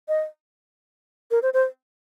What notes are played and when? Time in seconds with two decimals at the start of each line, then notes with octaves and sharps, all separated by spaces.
0.08 D#5
1.31 A#4
1.43 C5
1.54 C5